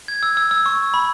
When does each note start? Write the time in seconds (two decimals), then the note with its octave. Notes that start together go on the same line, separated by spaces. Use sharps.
0.08 G#6
0.23 E6
0.37 E6
0.51 E6
0.66 C#6
0.94 B5